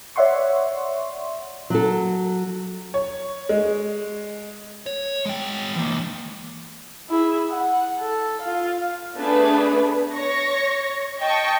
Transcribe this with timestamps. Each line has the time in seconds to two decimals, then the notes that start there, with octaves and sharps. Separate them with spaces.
0.16 C#5 D5 E5 F#5 C6 C#6
1.70 F#3 A4
2.94 C#5
3.49 G#3
4.86 C#5
5.26 G#3 G5
5.76 E3 A#3
7.10 E4 G#4
7.50 F#5
7.99 A4
8.42 F4 F5
9.17 A3 B3 D4 G#4 B4
10.15 C#5 C#6 A#6
11.21 D#5 G5 A5 C#6